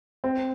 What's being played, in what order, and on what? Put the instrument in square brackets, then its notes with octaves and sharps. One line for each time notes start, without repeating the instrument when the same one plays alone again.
[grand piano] C4